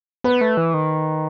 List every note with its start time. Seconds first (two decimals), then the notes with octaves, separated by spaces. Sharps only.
0.24 B3 B4
0.41 A3
0.57 E3
0.74 D#3